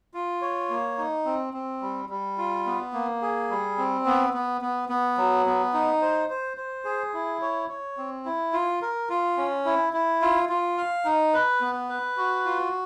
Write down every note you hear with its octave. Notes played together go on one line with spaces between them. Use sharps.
F4
C#5
A#3
D#4
C4
C4
G3
G3
F4
B3
A#3
G#4
G3
C4
B3
B3
B3
B3
F#3
B3
D#4
C5
C5
C5
G#4
E4
C#5
C#5
C4
E4
F4
A#4
F4
C#4
E4
E4
F4
F4
F5
D#4
B4
B3
B4
F#4
F4